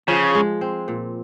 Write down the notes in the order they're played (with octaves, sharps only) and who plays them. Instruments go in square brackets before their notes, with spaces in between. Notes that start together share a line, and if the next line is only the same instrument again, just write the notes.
[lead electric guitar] C#3 [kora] F3
[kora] G#3
C4
A#2